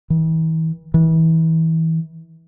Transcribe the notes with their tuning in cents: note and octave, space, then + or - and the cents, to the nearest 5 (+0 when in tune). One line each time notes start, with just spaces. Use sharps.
E3 -40
E3 -30